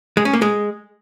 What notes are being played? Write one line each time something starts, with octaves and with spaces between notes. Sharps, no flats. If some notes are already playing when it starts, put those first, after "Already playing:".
G#3
C#4
A#3
G#3